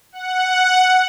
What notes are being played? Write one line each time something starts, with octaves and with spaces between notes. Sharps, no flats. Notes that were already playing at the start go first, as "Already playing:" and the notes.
F#5